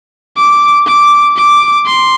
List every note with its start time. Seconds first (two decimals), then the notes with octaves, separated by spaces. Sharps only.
0.37 D6
0.87 D6
1.37 D6
1.86 C6